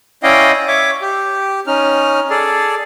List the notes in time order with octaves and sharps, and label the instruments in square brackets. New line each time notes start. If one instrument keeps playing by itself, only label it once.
[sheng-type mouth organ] C#4 E4 D5 D#5 F5 G5
C#5 E5 D6
G4
C#4 D#4 F6
G#4 A4 D5